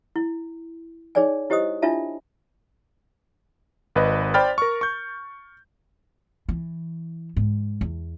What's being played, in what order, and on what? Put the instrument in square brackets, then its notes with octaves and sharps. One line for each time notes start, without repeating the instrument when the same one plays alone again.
[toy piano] E4
D#4 G#4 C#5 D5 G#5
E4 G4 C5 D#5 D#6
D4 E4 F4 E5 A5
[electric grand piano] G#1 B4 D#5
C5 D5 G5 B5 F6 A6
A#4 C#6
C#6 G6
[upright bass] E3
G#2
E2